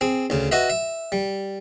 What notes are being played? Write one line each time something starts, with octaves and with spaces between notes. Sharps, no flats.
C4 G#4
D2 C#3
F#4 B4 D#5 E5
E5
G3